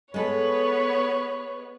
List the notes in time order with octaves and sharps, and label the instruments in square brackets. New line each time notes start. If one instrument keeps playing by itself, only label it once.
[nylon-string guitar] G#3 A4 [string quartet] B3 B4 [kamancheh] C#5